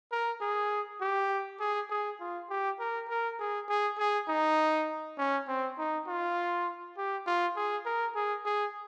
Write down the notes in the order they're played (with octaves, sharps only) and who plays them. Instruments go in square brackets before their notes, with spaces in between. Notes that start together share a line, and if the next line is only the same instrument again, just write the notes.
[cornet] A#4
G#4
G4
G#4
G#4
F4
G4
A#4
A#4
G#4
G#4
G#4
D#4
C#4
C4
D#4
F4
G4
F4
G#4
A#4
G#4
G#4